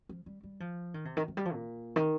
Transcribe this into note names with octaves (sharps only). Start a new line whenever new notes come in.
F3
G3
G3
F3
D#3
C3
D#3
F3
G3
F3
A#2
D#3